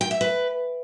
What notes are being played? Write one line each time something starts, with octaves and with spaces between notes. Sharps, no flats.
G5
E5
B4